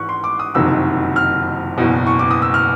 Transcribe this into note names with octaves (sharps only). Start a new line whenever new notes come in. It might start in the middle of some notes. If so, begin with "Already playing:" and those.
Already playing: G#1 G#2 E3 C#6 F#6
C6
D6
D#6
F#1 F2 C3 D#3 F#3 E6
F6
F#1 E2 B2
C#6
D6
D#6
E6
F6